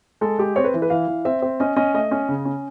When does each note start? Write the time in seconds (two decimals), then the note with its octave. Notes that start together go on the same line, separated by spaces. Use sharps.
0.21 G#3 A4
0.39 G#3 G4
0.56 C4 C#5
0.64 B4
0.74 E3
0.82 B4
0.90 E3 F5
1.07 E3
1.25 C4 E5
1.42 C4
1.60 C#4 D#5
1.76 C#4 D#5
1.94 A3 D#5
2.11 C#4
2.29 C#3
2.45 C#4